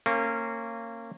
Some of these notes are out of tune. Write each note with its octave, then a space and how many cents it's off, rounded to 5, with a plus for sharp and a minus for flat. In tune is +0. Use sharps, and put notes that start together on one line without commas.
A#3 -25 C#4 -25